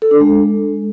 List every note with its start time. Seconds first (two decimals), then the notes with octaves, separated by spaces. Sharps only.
0.02 A4
0.11 D4
0.20 G#3